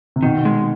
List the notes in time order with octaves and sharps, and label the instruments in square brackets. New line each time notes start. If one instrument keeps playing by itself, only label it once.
[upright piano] C3
[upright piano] B2 [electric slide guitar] D#3
[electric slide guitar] G#3